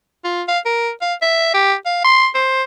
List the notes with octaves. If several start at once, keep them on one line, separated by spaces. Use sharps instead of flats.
F4
F5
A#4
F5
E5
G4
F5
C6
C5